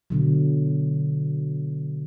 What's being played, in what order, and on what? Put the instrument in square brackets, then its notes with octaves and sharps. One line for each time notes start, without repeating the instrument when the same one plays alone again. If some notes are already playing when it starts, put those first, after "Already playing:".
[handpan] B2 D3 F#3